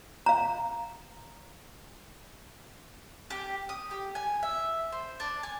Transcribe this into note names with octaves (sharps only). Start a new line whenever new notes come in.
F5 A#5
G4
D#6
G4
G#5
E5
C5
D4
G#5